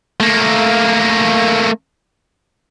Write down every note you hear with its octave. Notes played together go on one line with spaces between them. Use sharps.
A3 A#3